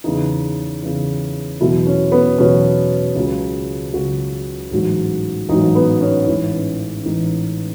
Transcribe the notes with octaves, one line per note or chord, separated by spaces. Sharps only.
E2 C#3 E3 D#4
E2 C#3 E3
E2 B2 F#3 E4
C#4
B3
E2 B2 F#3 C#4
C#2 C#3 F#3
C#2 C#3 F#3 F#4
A1 G#2 F#3
A1 G#2 F#3 D#4
B3
C#4
A1 G#2 E3
A1 G#2 E3 D#4